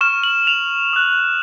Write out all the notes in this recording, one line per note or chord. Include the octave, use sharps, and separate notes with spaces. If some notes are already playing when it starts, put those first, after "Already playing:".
C#6 F6 E7
F#7
F7
D#6 F#6